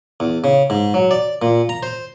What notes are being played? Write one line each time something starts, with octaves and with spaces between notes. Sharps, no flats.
E2
C#3
G#2
F#3
D5
A#2
A#5
C5